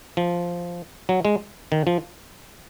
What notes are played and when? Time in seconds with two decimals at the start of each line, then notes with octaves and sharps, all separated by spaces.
0.17 F3
1.09 F#3
1.25 G#3
1.72 D#3
1.87 F3